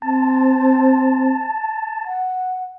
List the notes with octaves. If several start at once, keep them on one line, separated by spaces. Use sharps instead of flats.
C4 A5
F#5